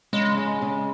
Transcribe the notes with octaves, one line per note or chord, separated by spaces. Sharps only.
C#3 G#3
G#3
C#3